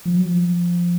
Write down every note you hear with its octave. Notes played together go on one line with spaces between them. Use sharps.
F3
F#3
F3